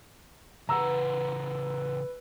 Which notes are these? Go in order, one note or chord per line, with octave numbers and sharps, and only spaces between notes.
C#3 E3 B4 F#5 A#5 E6